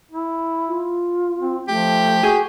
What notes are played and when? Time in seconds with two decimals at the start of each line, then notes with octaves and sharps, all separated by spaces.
0.11 E4
0.68 F4
1.38 C4
1.68 F3 A3 G4
2.23 F#4 G#4